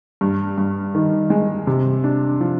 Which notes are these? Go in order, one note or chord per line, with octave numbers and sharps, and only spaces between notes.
G2
G2
D#3
G#3
C3
D4
F3